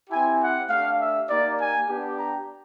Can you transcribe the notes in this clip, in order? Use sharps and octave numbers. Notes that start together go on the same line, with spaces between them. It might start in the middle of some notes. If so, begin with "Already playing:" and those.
C4 E4 G4 G#5
F#5
A3 D4 G4 F5
E5
A#3 D#4 G4 D5
G#5
B3 D4 G4
A#5